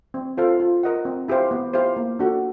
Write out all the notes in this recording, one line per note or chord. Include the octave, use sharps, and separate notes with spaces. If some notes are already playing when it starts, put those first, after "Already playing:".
C4
F4 A4 C5 F5
F4
A#4 D#5 F#5
C4
E4 G4 C5 F5
B3
E4 G4 C5 F5
A#3
D4 F#4 A4